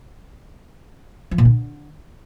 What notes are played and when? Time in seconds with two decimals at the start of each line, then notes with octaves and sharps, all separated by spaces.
1.31 F3
1.38 A#2
1.45 D3